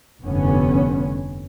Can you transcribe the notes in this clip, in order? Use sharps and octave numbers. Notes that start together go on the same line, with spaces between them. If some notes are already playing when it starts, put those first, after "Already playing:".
F1 G2 D3 B3 C#4